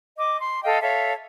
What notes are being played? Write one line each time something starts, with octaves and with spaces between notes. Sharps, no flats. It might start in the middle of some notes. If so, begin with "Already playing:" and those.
D#5 D6
C6
A4 D#5 F5 G5
A4 C#5 E5 F5